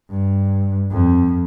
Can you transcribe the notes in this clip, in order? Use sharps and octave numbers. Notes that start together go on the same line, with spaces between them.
G2
F2